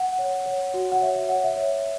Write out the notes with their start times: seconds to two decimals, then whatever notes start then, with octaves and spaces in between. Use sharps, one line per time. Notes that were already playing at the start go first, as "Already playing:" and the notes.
Already playing: F#5
0.19 C#5
0.46 C#5
0.74 F#4
0.92 F#5
1.01 C#5 E5
1.15 E5
1.29 C#5 F#5
1.44 E5
1.57 C#5